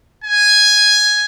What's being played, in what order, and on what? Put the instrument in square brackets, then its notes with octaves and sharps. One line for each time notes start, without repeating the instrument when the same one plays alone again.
[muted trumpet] G#5